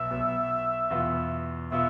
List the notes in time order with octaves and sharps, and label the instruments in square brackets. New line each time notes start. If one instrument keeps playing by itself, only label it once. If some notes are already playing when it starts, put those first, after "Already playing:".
Already playing: [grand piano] B1 B2 B3 [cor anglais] E5
[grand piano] B1 B2 B3
E2 B2 B3 F4
[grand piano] B2 B3 F4 [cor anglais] E5